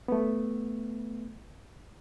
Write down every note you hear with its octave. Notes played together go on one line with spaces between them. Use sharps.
A3 B3